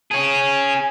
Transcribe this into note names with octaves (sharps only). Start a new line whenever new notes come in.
C#4 G#4